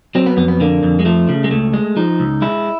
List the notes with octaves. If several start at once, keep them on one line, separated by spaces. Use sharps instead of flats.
F#3 C4
B3
F2 B3
B3
D3 A#3
F2
G#3
F3 A3
C#3
G#3
C#2 A3
G#3
F3 D#4
C#2
G#3 E4